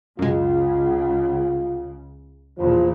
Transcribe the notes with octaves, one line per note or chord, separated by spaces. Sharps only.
C#2 F#2 C#3 G#3 F4
E2 G2 A#2 F3